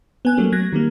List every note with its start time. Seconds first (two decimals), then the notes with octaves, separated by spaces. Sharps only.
0.25 B3 G#5 F#6
0.37 F#3 G3 A3 A#3 C#4
0.52 F#3 F#6 G#6 A#6
0.73 D#3 G3 A#3